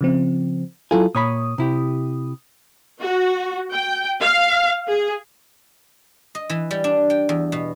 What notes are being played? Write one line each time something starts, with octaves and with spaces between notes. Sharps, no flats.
C#3 F3 C4
F#3 E4 F4 A4 G#5
A#2 C#5 B5 D#6
C3 E4 G4
F#4
G5
F5
G#4
D#5
E3
G3
D4
G5
E2
B2